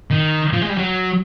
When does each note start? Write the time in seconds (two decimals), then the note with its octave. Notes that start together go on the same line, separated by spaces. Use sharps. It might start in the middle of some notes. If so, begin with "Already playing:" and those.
0.11 D#3
0.53 F3
0.62 G#3
0.70 G3
0.78 F#3